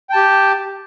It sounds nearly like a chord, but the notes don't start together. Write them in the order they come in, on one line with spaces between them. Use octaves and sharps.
G5 A5 G4